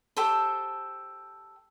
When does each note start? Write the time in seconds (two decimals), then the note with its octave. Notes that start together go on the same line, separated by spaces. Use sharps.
0.17 G4 A4 C5